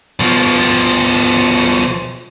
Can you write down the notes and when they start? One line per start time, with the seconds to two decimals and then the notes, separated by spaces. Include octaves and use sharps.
0.20 B2 F3